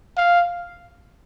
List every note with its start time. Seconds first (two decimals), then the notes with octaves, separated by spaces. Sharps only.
0.17 F5